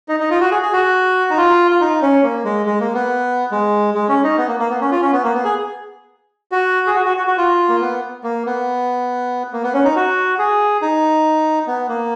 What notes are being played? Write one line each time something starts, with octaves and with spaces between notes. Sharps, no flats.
D#4
D#4
F4
F#4
G#4
G#4
F#4
D#4
F4
F4
D#4
C#4
A#3
G#3
G#3
A#3
B3
G#3
G#3
C#4
D#4
B3
A#3
A#3
B3
C#4
F4
C#4
B3
A#3
B3
G#4
F#4
G#4
F#4
F#4
F#4
F#4
F4
A#3
B3
A#3
B3
A#3
B3
C#4
D#4
F#4
G#4
D#4
B3
A#3